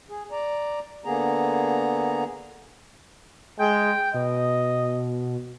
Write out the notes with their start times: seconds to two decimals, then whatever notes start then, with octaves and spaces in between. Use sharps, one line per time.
0.09 G#4
0.32 D5 A#5
1.05 D3 A#3 B3 G#4 A#5
3.59 G#3 G5
4.14 B2 D#5